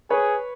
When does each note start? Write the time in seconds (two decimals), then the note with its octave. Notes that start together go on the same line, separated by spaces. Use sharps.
0.10 G#4 B4 C#5